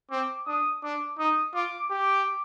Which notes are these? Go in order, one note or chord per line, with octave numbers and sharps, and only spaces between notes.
C4 D6
D4 D#6
D4 D6
D#4 D#6
F4 D6
G4 D6